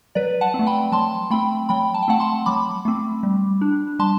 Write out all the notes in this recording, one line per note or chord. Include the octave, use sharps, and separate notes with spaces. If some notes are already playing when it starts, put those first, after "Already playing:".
F#3 B4 D5
F#5 A5
C4
A3
G5 B5
F#3 A5 C6
A3 C4 G5 B5
F#3 G5 B5
A5
G5
A3 C4 F#5 A5
A5 C6
F#3 B5 D6
A3 C4
G3
D4
G3 A5 C6